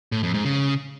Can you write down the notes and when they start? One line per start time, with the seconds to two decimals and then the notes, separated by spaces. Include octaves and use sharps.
0.12 A2
0.23 F2
0.34 G#2
0.45 C#3